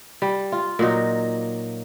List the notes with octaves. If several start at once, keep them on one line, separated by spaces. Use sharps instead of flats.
G3
F4
A#2 F#3 D#4